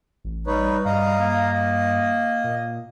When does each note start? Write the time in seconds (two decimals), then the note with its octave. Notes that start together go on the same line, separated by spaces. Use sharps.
0.24 A1
0.47 G3 D#4 B4 C#5
0.85 G2 D#5 F5 A#5
1.19 A#3
1.54 D#5
2.44 A#2